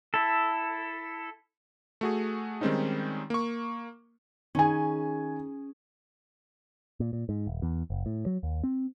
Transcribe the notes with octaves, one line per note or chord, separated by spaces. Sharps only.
E4 A4
A3 F#4 G#4
D#3 G3 G#3 C4 C#4 D#4
A#3 C#6
D#3 C#4 G#4 G#5
A#2
A#2
G#2
D#1
E2
F#1
A2
F#3
D#2
C4